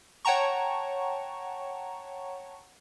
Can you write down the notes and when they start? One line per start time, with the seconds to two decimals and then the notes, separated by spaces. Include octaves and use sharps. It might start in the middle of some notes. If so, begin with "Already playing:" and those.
0.25 C#5 F#5 G5 A5 A#5 C#6